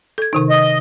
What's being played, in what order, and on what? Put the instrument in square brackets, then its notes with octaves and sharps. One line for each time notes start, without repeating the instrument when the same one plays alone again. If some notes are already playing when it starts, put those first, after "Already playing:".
[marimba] A4 G#6
C3 D#3 D#4
[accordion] D#5